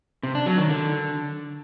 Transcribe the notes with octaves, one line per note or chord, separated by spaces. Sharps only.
C3
D4
F#3
D#3
D3